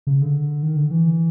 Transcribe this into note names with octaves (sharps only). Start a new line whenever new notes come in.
C#3
D3
D#3
D3
E3